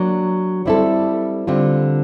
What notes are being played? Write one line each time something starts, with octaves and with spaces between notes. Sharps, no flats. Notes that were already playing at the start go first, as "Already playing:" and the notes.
Already playing: F#3 A#3 D4
G3 C4 E4 A4
D3 G3 C4 F4